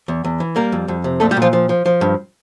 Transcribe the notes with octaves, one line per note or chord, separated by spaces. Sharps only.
E2
E2
E3
G3 A#3 A#4
F2
F2
C3
A#2 A3 A4
G3 G4
A#2
F3 F4
F3
F3
F3
G2